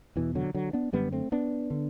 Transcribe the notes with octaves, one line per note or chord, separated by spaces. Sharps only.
E2 B2 E3
D3 F#3
D3 F#3
B3 D4
F#2 D3 G3 B3
A3 C4
B3 D4
D3